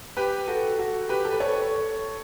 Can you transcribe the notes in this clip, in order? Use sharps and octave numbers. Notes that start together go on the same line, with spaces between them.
G4 B4
F#4 A4
F#4 A4
G4 B4
A4
B4
A4 C#5